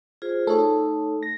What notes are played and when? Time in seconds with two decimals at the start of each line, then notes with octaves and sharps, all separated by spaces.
0.22 F4 G#4 C5
0.47 A3 D#4 A4 C#5 A5
1.23 A#6